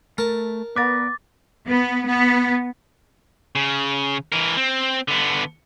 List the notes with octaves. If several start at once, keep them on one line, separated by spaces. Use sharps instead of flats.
A3 A#4 A5
B3 B4 D5 A#5 D6 A6
B3
B3
C#3
E3 A#4
C4
D3 B3